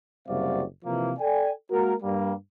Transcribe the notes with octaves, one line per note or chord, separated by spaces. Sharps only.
F#1 C3 G3 F#4 D5 F5
C3 E3 F3 A#3
A4 D5 G5 G#5
G#3 A#3 F#4 A#4
G2 G3 A#3